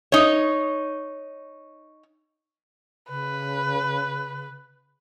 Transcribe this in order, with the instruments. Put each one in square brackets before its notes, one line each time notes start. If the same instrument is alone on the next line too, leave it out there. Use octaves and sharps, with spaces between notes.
[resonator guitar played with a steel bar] D#4 C#5
[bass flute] C#3 [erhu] B4